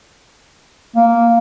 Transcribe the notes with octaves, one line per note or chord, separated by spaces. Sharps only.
A#3